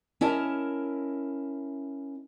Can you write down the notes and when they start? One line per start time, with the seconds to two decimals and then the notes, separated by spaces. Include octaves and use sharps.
0.21 C#4 E4 A#4 D#5 A5